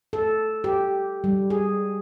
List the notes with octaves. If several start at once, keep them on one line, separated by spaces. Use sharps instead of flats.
A4
G4
G3
G#4